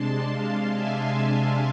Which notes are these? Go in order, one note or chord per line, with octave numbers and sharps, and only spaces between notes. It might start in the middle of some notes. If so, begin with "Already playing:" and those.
Already playing: C3 G#3 D4 A5 C6
F5 A5
E5 G#5